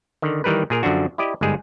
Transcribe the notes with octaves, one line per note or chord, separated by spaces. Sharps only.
D3 D#3
D#3 E3 G3 A#4 B4
A#2 G#4 A#4
F#2 D3 F3 D4 F#4
E4 G4 D5 D#5
G1 G#2 G3 G#3 G#4